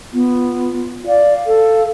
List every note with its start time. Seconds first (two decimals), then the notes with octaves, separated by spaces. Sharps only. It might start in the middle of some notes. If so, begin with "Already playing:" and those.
0.13 B3 F4
1.07 D5 F5
1.47 A4